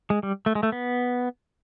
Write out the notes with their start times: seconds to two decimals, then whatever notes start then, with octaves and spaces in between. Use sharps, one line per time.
0.10 G#3
0.23 G3
0.46 A3
0.55 G#3
0.63 A3
0.72 B3